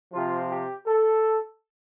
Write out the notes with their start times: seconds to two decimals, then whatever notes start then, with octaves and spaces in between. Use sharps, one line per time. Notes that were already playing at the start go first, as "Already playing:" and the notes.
0.13 C3 F3 F4
0.50 G4
0.87 A4